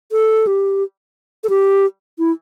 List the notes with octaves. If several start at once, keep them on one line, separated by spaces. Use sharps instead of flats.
A4
G4
A4
G4
E4